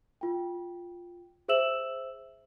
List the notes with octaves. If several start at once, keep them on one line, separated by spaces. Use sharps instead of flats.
F4 G5
G#4 C5 E5 E6 E7 F#7